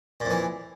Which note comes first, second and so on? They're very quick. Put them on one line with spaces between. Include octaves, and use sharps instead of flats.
A#2 F2 E3